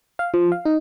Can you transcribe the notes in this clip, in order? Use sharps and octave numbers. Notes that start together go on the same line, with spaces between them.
F5
F3
F5
D#4